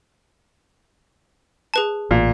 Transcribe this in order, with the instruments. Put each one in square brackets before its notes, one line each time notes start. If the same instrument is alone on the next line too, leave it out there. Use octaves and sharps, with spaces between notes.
[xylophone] G#4 B4 A5
[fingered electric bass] A1 [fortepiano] A#2